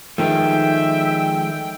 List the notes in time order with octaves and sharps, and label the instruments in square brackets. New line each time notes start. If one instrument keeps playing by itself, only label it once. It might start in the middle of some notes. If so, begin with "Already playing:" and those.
[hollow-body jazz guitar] D#3 A3 [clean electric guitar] F3 G#3 [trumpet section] E5 [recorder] G5